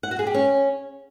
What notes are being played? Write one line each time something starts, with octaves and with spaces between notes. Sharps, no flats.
F#5
F#4
G#4
G4
C#4